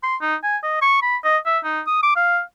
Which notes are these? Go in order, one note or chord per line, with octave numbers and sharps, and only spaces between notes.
C6
D#4
G#5
D#5
C#6
B5
D#5
E5
D#4
D#6
D6
F5